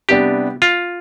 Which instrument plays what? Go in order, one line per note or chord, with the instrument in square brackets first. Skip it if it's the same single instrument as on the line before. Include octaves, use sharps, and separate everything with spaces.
[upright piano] C3 G3 B3 D4 [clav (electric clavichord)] G4
[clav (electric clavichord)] F4